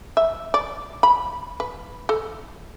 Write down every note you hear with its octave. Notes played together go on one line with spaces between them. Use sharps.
E5
D5
B5
B4
A4